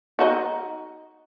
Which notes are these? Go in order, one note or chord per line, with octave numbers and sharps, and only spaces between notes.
D#4 F#4 D#5